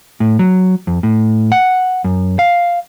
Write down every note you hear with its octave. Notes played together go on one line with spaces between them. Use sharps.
A2
F#3
F2
A2
F#5
F#2
F5